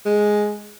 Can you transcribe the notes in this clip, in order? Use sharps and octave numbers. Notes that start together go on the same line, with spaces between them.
G#3